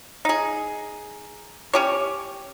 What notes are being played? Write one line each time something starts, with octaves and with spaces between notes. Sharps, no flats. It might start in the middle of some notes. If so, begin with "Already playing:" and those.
D#4 G#4
C#4 G4 C#5